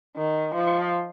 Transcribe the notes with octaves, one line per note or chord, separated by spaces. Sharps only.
D#3
F3